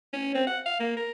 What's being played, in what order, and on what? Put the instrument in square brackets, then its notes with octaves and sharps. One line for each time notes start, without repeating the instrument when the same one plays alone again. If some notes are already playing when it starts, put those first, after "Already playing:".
[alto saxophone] C#4
C4
F#5
F5
A#3
A#4